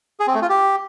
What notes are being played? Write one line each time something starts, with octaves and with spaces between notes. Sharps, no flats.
G#4
C4
A3
F4
G4